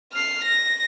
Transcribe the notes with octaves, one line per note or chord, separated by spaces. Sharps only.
F6 C7
A#6